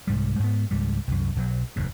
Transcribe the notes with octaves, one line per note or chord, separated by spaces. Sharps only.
C2 G#2 G3
G#2 B3
C#2 G#2 G3
C2 F#2
B1 F#3
F1 D#2 G#2